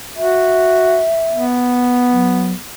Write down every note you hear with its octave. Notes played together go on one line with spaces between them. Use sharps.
F#4 E5
B3
F#3